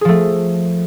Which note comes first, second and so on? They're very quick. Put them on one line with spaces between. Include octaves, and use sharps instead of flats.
G#4 F3 A3